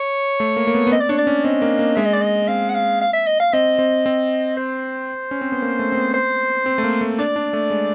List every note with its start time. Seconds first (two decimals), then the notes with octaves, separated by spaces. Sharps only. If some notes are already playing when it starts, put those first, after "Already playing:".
Already playing: C#5
0.40 A3
0.57 A#3
0.67 A#3
0.75 B3
0.87 B3
0.92 C4 D#5
1.00 D5
1.09 D4 C#5
1.18 D5
1.27 C#4
1.45 C4 D#5
1.62 A#3
1.79 A#3
1.96 G#3 E5
2.05 D#5
2.14 D5
2.21 D#5
2.48 C4 F5
2.69 F#5
2.75 F5
3.01 F5
3.13 E5
3.27 D#5
3.40 F5
3.53 C4 D#5
3.79 C4
4.06 C4
4.57 C5
5.31 C#4
5.41 C4
5.52 B3
5.62 A#3
5.79 A3
5.92 C4
5.97 B3
6.14 C5
6.66 C4
6.78 A3
6.84 A#3
7.01 A3
7.19 D4 D5
7.36 D4
7.53 A3
7.70 G#3